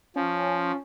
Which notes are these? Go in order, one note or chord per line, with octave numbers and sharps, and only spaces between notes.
F3 C#4